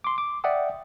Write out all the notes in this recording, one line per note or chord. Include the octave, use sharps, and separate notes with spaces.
C6 D6
D6
D5 E5 F#5 G5 D#6